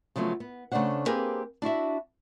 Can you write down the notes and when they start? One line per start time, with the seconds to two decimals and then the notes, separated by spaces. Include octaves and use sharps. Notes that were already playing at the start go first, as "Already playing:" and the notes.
0.16 C#3 F3 F#3 A3 B3 C#4
0.40 B3
0.72 C#3 A3 C4 D4 C5 F#5
1.06 A#3 C4 G4 G#4 A#4 B4
1.62 D4 E4 F#4 E5